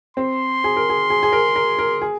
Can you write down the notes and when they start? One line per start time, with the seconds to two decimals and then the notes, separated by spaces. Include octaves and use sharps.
0.17 C4 C6
0.64 G#4
0.76 A#4
0.90 G#4
1.10 G#4
1.23 G#4
1.33 A#4
1.56 A#4
1.79 A#4
2.01 G#4